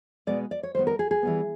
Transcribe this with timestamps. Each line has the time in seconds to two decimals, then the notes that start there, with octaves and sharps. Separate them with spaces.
0.27 B2 G#3 B3 D5
0.51 D5
0.63 C#5
0.75 D#3 G3 B3 C5
0.87 A#4
0.99 G#4
1.11 G#4
1.23 E3 G3 B3